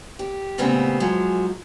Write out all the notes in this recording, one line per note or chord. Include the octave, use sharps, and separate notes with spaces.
G4
A#2 C#3 G3 A3 B3 C4
G#2 F3 F#3 G#3